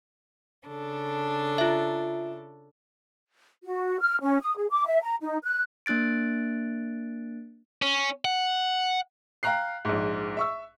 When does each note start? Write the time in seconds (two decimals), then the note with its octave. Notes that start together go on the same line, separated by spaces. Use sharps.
0.68 C#3 D4 A4
1.58 F4 E5
3.64 F#4
4.00 F6
4.21 C#4
4.41 D#6
4.57 G#4
4.70 D6
4.86 E5
5.02 A#5
5.20 D#4
5.43 F#6
5.86 A#3 D4 F#6 A6 D7
7.82 C#4
8.25 F#5
9.43 F5 G5 A#5 F#6 C7
9.85 A#1 G#2
10.37 E5 C#6 E6